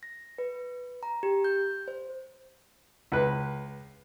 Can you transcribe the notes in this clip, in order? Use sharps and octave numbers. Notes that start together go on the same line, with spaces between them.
A#6
B4
A#5
G4
G6
C5
C#2 B4